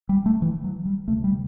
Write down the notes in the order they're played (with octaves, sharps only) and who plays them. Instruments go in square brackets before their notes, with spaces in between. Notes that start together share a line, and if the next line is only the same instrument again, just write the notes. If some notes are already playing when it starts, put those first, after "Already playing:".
[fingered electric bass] G3
A3
E3
F#3
G3
D2 C3 A3
G3